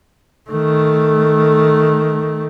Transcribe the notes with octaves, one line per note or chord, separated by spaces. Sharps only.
D#3 A3